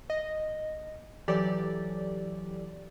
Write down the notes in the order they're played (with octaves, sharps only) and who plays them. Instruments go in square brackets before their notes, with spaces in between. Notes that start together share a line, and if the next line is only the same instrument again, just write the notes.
[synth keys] D#5
E3 F#3 G4 A4 D5